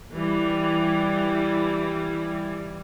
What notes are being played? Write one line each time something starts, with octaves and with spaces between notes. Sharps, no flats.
E3 G3